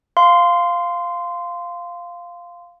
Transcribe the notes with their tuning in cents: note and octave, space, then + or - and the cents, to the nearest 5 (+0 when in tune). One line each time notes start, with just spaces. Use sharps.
F5 +0 C6 -15